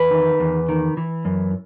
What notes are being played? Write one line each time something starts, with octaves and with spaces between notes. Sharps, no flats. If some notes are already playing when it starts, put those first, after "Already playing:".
Already playing: E2 B4
D#3
E2
D#3
E3
F#2